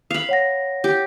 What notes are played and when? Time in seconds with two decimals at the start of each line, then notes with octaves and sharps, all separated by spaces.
0.11 F5 B5
0.29 C#5 F#5 A#6
0.84 G4